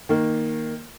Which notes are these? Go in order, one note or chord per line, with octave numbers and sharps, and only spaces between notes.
D#3 A#3